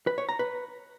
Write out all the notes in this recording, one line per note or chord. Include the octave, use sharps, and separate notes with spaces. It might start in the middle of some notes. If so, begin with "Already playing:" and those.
B4
C#5
A#5
B4